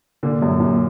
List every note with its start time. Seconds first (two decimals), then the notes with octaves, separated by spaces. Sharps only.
0.23 A#2 D3
0.41 F#2 A#2
0.60 F#2 A#2